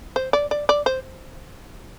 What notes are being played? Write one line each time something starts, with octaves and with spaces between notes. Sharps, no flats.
C5
D5
D5
D5
C5